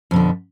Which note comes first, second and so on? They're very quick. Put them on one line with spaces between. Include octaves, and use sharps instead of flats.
F2 B2 D3